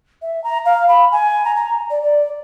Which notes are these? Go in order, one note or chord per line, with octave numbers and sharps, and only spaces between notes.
E5
A#5
F5
B5
G#5
A#5
A#5
D5
D5